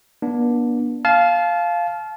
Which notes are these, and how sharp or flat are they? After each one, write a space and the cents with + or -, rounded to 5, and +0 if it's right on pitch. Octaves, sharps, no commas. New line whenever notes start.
B3 -45 D4 +0
F5 +0 A5 -30